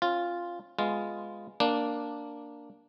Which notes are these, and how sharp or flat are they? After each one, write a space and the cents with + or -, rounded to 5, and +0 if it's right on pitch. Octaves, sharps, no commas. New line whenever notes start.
C#4 -45 F4 +0
G#3 +0 B3 +10 F4 +0
A#3 +0 D4 +0